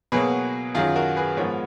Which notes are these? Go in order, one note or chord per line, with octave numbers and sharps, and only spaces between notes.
B2 F#3 A#3 G#4 B4
F#2 D#3 F#3 F4 G#4
F#4 A#4
G#4 B4
G#2 F3 G#3 B3 A#4 C#5